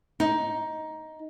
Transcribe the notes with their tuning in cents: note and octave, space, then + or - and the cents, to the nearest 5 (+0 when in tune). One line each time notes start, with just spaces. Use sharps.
D#4 +10